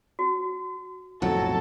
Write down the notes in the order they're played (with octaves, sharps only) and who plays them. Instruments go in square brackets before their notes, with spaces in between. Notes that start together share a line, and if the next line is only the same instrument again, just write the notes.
[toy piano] F#4
[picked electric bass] B1 F2 A2 [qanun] F#3 [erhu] A4